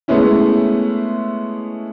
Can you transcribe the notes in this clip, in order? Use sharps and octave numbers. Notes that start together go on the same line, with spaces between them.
G#3 A3 B3 C#4 E4